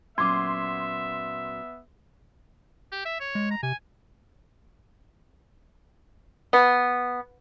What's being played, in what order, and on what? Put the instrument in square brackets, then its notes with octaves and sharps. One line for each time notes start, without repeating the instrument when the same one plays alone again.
[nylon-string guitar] A#2 F#3 C#4 [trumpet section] B3 E5 [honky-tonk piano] C6 [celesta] D6 G#6
[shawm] G4
E5
C#5
[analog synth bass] G#3
[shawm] A#5
[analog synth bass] C3 [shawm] G#5
[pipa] B3